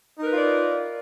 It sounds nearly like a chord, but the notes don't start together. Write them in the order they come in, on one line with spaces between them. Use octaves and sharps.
D#4 A#4 B4 F4 D5